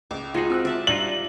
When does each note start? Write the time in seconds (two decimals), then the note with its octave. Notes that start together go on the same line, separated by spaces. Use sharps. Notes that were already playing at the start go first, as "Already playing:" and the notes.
0.11 C#2 D6
0.34 G#3 D#4 F4 F#4 G#4
0.50 C4 E6 F#6
0.65 D5 E5 A5
0.87 G3 D4 D#4 F4 F#7